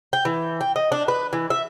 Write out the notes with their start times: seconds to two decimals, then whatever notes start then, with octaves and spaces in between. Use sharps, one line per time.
0.13 G5
0.25 E3
0.61 G5
0.76 D#5
0.92 D4
1.08 B4
1.33 E3
1.50 E5